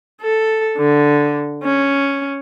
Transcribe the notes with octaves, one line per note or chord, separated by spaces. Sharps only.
A4
D3
C#4